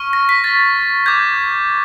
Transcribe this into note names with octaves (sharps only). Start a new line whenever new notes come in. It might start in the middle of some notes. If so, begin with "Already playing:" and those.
Already playing: C#6 F6
A#6
B6
A6
D6 G6 G#6